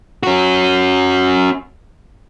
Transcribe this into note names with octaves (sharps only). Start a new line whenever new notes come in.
C#4 F#4